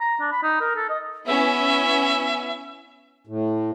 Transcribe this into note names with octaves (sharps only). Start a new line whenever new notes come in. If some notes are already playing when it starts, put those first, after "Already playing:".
A#5
D4
B5
D#4
A#4
A4
D#5
B3 C#4 E4 E5
A2